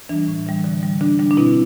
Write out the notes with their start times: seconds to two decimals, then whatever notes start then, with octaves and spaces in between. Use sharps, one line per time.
0.09 E3 G3 D4
0.28 A2
0.46 E3 G3
0.64 D3
0.83 G3
1.01 D3 D4
1.19 G3 D4
1.31 D4
1.37 B2 C4 E4